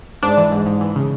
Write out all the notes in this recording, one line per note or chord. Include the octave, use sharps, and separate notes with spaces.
G#2 D4
E3
G#2
G#2
E3
C#3